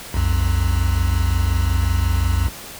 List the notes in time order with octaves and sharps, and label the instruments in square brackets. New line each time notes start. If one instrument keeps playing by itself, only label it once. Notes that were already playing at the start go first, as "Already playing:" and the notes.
[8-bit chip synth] B1 F2